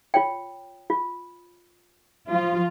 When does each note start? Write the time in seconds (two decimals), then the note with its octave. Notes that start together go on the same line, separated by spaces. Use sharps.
0.14 F4 C#5 G5
0.90 F4
2.27 F3 F4